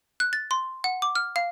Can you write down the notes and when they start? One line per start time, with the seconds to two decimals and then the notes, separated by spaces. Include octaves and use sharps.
0.20 F#6
0.33 A6
0.51 C6
0.84 F#5
1.02 D6
1.15 F6
1.36 F5